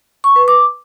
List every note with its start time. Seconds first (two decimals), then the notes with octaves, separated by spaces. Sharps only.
0.24 C#6
0.36 B4
0.48 D6